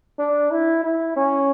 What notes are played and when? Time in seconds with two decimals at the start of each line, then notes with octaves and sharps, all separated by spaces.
0.19 D4
0.51 E4
0.83 E4
1.16 C#4